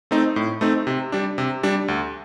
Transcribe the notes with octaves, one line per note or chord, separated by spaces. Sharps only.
A3 C4 D#4
A2
A3 C4 D#4
C3
G3 D4
C3
G3 D4
D2